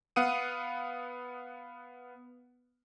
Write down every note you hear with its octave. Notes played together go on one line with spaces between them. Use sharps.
B3 F5 F#5 D#6 D#7